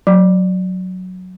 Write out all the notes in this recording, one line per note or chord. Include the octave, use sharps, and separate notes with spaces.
F#3